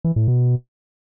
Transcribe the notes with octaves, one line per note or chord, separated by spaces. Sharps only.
E3
A2
B2